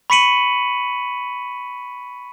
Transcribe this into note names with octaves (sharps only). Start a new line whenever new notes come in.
B5 C#6 B6 C#7 D#7 F#7